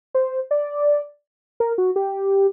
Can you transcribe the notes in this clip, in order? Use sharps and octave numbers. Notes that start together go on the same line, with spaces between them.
C5
D5
A#4
F#4
G4